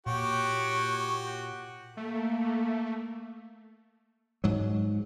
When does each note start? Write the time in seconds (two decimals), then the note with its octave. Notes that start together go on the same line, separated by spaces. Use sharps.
0.06 A#2 F#4 G4 C#5
1.97 A3 A#3
4.44 G#2 F#3